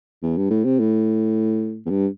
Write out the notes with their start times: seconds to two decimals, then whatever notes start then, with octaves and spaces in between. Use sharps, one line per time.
0.23 E2
0.37 G2
0.50 A2
0.65 C3
0.79 A2
1.86 E2
1.90 G2